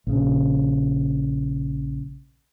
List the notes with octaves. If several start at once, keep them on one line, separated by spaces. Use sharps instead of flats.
A#1 C#3